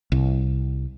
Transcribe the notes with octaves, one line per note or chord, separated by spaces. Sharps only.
C2